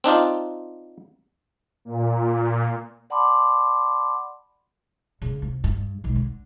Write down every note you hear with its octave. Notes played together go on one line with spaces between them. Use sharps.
C4 D4 D#4 F4
A#2
D5 F#5 A5 B5 C6 D6
C#3 A#3
C2
G2
B1 G#3
D3